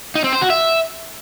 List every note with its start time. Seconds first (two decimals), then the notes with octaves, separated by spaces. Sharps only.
0.15 D#4
0.24 C4
0.33 C5
0.41 F#4
0.50 E5